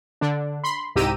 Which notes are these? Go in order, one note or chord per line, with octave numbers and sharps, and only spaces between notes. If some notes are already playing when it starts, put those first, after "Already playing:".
D3 D4
B5 C6
C2 G#2 G4 A#5 E6 D#7